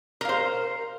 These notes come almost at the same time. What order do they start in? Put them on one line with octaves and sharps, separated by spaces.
A#4 F5 C5